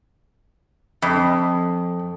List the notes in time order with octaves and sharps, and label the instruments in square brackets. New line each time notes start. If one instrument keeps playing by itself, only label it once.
[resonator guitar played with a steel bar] F2